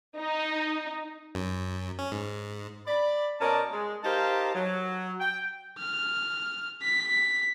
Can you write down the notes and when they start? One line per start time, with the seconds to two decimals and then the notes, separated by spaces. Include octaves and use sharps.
0.18 D#4
1.35 F#2
1.99 C#4
2.11 G#2
2.87 D5 B5
3.41 B2 C#4 A#4 D5 A5
3.72 G#3
4.04 D#4 G4 A#4 C5 F5 A5
4.55 F#3
5.20 G5
5.79 F6
6.82 B6